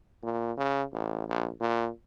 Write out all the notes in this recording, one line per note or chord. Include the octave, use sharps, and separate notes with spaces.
A#2
C#3
A1
A#1
A#2